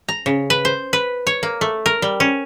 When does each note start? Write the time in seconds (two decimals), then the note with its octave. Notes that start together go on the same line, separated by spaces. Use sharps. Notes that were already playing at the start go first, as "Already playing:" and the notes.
0.09 A#5
0.26 C#3
0.50 B4
0.65 C5
0.93 B4
1.27 C#5
1.43 A#3
1.61 A3
1.86 A#4
2.02 G3
2.20 C#4